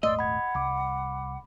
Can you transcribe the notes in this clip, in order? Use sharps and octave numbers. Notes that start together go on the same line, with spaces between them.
D#1 G#1 A3 D5 D#5 C6 E6
F#5 B5 G#6
C2 B5 D6